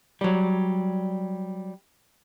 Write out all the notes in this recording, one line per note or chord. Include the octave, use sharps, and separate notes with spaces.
F#3 G3